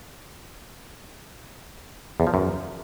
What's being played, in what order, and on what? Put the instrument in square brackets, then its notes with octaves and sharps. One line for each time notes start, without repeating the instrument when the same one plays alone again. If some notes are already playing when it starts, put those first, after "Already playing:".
[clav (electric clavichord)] E2
F3
F#2